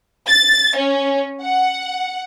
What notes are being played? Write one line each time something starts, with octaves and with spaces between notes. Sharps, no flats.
A6
C#4
F#5